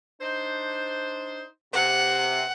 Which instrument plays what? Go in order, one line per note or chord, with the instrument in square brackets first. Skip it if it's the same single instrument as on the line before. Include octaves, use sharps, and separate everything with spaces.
[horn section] D4 D#4 C5
[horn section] C3 [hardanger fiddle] F#5